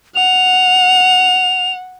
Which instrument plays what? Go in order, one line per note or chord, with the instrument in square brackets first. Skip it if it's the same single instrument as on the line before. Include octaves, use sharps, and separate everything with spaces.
[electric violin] F#5 [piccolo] F7